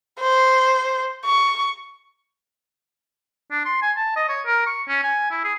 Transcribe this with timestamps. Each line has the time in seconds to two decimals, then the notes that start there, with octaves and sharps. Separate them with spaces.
0.20 C5
1.25 C#6
3.51 D4
3.65 C6
3.82 G#5
3.97 A5
4.16 D#5
4.29 C#5
4.46 A#4
4.67 C#6
4.88 C#4
5.03 G#5
5.31 E4
5.44 G#4